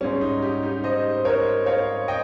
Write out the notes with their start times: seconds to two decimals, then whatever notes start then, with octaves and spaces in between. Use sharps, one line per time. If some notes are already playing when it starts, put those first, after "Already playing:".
0.01 G#2 G3 C#4
0.21 D#4
0.42 D#4 G4
0.63 D#4 G4
0.83 C5 D#5
1.16 C5
1.25 A#4 C#5
1.66 C#5 F5
2.08 D#5 G5